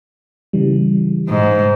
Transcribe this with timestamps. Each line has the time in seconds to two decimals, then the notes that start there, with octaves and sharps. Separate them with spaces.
0.53 C#3 E3 G3
1.29 G#2